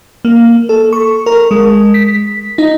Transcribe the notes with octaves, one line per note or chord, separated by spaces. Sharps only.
A#3
A4
C#6
A#4
G#3
B6
D#4